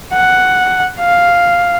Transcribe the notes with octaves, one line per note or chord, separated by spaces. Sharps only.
F#5
F5